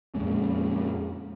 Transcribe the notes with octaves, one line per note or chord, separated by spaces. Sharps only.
F2 A#2 G#3 C#4